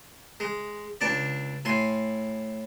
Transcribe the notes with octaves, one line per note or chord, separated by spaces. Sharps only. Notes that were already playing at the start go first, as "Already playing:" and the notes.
G#3
C#2 D4 D5
A2 G#5 C6